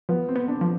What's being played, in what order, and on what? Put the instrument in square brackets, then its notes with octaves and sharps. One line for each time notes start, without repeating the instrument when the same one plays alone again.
[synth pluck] F3 [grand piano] B3
[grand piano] C4
[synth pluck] B3
[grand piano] D4
[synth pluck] F3